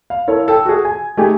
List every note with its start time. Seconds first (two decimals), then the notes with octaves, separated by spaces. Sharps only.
0.10 F5
0.28 E4 A4 A#4 C#5
0.48 A4 G5
0.65 F#4 G#4
0.85 G#5
1.17 A3 D#4 G4 G#4 G#5